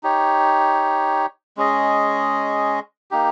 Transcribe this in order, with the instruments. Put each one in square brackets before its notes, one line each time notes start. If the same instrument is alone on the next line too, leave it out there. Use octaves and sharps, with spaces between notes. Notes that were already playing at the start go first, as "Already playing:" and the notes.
[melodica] D#4 G4 C#5
G#3 C#4 G#4 D#5
A#3 D#4 G4